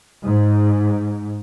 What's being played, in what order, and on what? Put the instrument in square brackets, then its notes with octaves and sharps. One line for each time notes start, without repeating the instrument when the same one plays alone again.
[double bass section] G#2